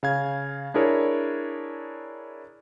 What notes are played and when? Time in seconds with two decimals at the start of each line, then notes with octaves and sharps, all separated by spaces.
0.03 C#3 F5 G#6
0.74 D4 E4 G#4 A#4 C#5